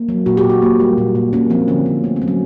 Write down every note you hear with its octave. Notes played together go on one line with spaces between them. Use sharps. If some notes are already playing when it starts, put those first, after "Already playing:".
Already playing: A#3
F#3
A#2 F#4
G4
A#2
F#4
A#3
G3
A#2
A#2
A#3 C#4
F3 C4
D3 C#4
D3
A3 B3
C4
F#3
C#4